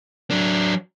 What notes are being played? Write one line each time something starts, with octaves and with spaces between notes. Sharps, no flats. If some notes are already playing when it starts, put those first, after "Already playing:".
F#3 D4